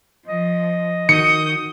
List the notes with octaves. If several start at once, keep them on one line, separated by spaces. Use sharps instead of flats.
F3 D#5
D#3 F#4 D#6 G6 C#7